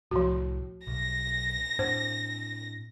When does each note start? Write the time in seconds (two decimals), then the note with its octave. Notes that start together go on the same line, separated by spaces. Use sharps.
0.11 C2 A2 F3 F#4
0.87 B1 A#6
1.79 A2 C4 D4 C5